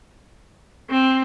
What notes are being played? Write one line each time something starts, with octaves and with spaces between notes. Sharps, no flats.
C4